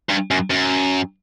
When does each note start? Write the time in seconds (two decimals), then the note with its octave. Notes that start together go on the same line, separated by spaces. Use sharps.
0.09 G2
0.31 F#2
0.51 F#2